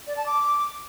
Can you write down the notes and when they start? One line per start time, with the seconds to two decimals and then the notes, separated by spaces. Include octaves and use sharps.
0.07 D5
0.17 A5
0.26 D6